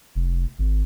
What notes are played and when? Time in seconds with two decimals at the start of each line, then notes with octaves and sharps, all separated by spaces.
0.15 F1
0.59 G#1